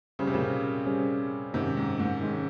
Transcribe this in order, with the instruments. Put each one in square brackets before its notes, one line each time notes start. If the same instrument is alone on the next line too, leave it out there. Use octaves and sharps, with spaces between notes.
[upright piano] C#3 [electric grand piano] G3 C#4 G#4 C5
[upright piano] C3
A#2 C#3
[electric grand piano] G3 C#4 G#4 C5
[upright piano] G#2 C3 [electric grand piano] D#3 G#3 C#4
[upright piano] G#2
G#2
[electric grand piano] D#3 G#3 C#4